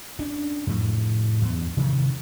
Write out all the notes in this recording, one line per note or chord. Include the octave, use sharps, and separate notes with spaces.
C#4 D4
F2 A2
E2 G2
C3 D#3 E3 G3